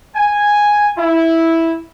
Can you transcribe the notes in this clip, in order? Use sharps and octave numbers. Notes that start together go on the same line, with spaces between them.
G#5
E4